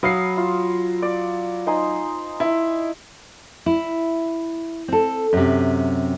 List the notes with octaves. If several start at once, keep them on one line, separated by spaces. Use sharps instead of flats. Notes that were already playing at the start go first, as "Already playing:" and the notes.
F#3 F5 B5 D#6 C7
F4
D5
D#4 C5 G#5
E4
E4
C4 A4
F#2 C3